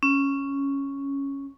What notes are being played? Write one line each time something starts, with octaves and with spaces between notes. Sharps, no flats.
C#4